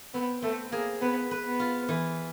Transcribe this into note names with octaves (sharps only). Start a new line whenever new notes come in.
B3 C4
A3 C4
A#3 G#4
B3 B4
B4
B3
F4
E3